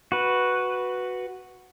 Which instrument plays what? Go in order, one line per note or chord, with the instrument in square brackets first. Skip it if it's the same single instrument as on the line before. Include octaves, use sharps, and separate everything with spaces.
[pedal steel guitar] F#4 B4